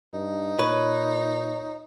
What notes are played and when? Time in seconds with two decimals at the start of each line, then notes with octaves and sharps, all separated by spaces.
0.14 G2 D#4
0.59 A#2 B4 C#5